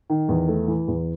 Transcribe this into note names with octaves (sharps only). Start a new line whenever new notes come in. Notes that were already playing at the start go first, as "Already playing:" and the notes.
D#3
E2
A3
E3
E2